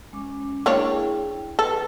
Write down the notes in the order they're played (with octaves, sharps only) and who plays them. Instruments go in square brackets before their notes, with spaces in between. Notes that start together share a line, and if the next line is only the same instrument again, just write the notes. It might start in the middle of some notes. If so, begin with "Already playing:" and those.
[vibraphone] G#3 C#4 D6
[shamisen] A#3 D4 C#5 [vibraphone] E4 G#4 G5
[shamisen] A4 [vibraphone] B4